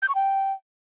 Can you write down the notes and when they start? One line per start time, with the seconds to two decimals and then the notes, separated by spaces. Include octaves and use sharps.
0.02 G6
0.09 C#6
0.15 G5